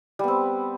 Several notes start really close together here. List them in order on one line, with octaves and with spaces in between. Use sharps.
G3 B3 C4